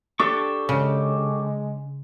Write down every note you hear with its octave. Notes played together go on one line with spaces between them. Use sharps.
D4 G4 A4 C#6
C#3 G#3